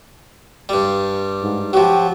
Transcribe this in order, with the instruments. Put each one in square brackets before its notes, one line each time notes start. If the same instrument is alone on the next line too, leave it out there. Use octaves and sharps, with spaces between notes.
[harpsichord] G2 G3
[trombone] G#2
[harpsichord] F3 F#3 [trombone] G4